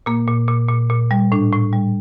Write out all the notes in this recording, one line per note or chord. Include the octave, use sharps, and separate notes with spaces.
A#2 A#3
A#2
A#2
A#2
A#2
G3
A2 D4
A2
G3